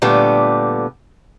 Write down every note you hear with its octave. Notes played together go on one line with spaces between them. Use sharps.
A#2 D3 G3 A3 B3 B4